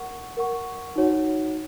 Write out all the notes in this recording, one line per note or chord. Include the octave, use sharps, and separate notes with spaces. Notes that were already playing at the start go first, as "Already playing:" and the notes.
Already playing: A#4 F#5 C#6
A#4 F#5 C#6
D#4 F#4 C#5 F#5